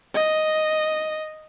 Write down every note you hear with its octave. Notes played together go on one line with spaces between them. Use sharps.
D#5